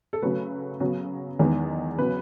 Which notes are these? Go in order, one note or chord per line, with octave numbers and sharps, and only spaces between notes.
A4
C#3 F#3 A3 B4
C#3 F#3 B3
E2 D#3 G#3 B3
C#3 F#3 B3 B4